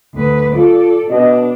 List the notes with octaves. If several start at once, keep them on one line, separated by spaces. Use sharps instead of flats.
D2 B4
F4 A4 D5
B2 D4 D#5